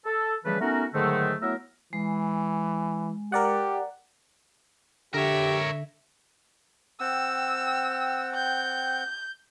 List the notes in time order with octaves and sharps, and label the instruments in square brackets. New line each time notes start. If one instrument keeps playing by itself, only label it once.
[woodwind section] A4
C#3 E3 F3 G3 A3 B4
A3 B3 C#4 D#4 F#4 A#4
G#2 D3 D#3 F#3 G#3 A3
F#3 A3 B3 E4 A#4 E5
[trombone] E3 [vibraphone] G#3
[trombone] G4 [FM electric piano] A#4 D5 F#5
[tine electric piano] D3 [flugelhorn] G4 [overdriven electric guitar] A#4 C#5 [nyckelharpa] E5
[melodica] C4 F#5 G5 [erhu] E6
[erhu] G6